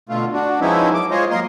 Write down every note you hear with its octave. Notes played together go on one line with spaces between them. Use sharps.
B2 D3 A3 F4
D4 F#4
F3 G#3 B3 C#4 D#4 E4
F#2 D6
G#3 F4 G#4 C5 C#5 D#5
F#2 A#3 A#4 D#5 C6